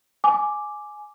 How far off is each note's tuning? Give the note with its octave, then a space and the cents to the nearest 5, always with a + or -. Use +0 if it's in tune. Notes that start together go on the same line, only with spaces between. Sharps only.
G#5 +10 D6 +0